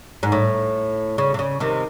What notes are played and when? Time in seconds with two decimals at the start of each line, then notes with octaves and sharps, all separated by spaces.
0.23 G#2
0.32 A2
1.18 C#3
1.34 C3
1.39 C#3
1.60 C3 D#3